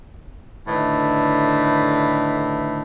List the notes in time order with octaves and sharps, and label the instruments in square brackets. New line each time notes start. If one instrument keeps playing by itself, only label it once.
[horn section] A2 D3 D#3 B4 E5